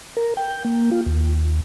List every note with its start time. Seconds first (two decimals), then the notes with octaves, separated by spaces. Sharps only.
0.17 A#4
0.37 G5
0.65 A#3
0.91 F4
1.06 D#2